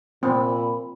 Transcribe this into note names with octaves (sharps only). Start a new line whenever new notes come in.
A#2 C4 B5